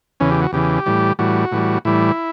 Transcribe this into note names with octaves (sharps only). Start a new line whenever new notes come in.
E2 C#3 E3 C#4
G4
F#4
E2 C#3 E3 G4
A2 E3 G3
A2 E3 G3 F#4
A2 E3 G3
A2 E3 G3 E4